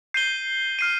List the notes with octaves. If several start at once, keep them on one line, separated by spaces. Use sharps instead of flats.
G6 C7 D#7 G7
F6 C7 D#7